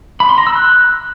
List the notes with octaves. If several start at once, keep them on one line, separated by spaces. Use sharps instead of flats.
B5
C6
A#5
E6
F#6